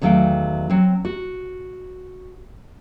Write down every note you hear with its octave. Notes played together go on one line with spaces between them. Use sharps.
E2 D#3 F#3 A3 F5 G5
F#3 C4
F#4